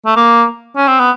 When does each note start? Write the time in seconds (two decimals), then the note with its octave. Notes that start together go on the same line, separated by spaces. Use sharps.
0.06 A3
0.16 A#3
0.77 C#4
0.88 C4
1.00 B3